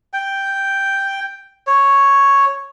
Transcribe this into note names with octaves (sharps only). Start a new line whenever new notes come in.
G5
C#5